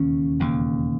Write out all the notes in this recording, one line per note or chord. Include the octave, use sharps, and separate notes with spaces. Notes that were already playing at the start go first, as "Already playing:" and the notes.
Already playing: E1 D#2 C#3 C#4
E1 D#2 C#3